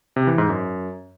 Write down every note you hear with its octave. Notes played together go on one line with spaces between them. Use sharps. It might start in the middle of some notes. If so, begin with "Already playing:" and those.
C3
E3
G#2
F#2